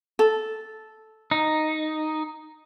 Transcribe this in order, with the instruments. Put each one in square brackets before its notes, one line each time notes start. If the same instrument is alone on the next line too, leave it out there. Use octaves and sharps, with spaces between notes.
[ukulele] A4
[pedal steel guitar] D#4